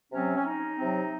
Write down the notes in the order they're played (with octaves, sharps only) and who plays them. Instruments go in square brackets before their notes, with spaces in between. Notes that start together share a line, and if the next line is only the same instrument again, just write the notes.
[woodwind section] C3 F#3 C4 C#4
C#4
D#4
C3 F#3 C4